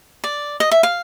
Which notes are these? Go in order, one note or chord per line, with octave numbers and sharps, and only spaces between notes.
D5
D#5
E5
F5